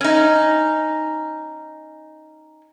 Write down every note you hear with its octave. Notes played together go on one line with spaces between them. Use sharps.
C#4 D#4